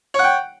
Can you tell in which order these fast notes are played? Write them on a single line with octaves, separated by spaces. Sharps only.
C#5 F#5 G5